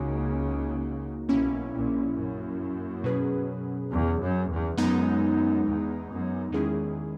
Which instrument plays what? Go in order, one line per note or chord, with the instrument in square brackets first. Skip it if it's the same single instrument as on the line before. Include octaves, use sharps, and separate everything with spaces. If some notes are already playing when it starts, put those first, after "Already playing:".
Already playing: [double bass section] C#2 C#3 [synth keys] A#3 D#4 F#4
[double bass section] B1 B2 [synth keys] A#3 C#4 E4
[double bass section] A#1 A#2
F#2
[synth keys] B2 F#3 C#4 G#4 B4
[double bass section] E2
F#2
E2
[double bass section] F#2 [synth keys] G#3 B3 D#4
[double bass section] E2
F#2
[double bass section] E2 [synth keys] D#3 G#3 C#4 E4 G#4